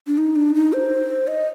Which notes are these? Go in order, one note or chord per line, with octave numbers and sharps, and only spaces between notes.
D4
D#4
D4
D#4
C5
D#5